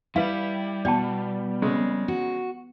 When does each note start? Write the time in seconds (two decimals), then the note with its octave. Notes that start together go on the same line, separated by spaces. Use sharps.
0.16 G3 E4 B4 F5
0.85 B2 D5 G5 A5
1.62 F2 C#3 G#3
2.08 F#4